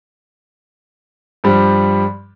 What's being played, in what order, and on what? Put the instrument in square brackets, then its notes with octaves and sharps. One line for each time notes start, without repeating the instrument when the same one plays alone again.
[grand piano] G2 F3 G3